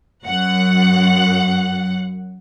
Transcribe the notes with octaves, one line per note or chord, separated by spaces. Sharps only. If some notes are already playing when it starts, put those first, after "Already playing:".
F#2 F#5